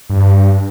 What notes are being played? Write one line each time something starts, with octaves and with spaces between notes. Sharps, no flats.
G2